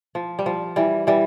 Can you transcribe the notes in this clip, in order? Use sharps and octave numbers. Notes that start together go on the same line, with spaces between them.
F3
G3
F3
E3 G3
E3 G3